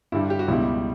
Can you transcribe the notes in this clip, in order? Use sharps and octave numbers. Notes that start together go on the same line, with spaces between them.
G2 D3 G3 E4
G4
F#4
C#2 B2 G3 E4